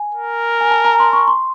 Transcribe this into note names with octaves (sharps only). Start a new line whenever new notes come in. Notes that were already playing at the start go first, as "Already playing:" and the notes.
Already playing: G#5
A#4
G#5
A5
A#5
C6
C#6
C6